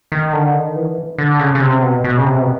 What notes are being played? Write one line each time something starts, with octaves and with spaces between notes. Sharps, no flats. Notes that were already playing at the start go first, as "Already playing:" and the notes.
D#3
D3
D#3
E3
D3
C#3
C#3
C3
B2
B2
C#3
C3
B2